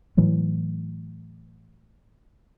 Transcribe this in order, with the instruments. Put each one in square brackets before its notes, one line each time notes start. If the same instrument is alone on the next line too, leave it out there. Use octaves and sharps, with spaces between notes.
[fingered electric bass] A2 E3 F#3 A3